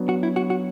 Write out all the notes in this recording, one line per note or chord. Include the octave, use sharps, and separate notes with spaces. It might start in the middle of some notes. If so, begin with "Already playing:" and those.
Already playing: F#3 B3 D4
F#4
E4
F#4
F#4